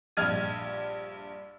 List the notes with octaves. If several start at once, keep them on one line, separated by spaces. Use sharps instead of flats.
A#1 G2 F6 G#6 D#7